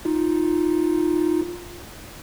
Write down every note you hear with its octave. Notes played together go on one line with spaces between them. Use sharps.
D#4 F4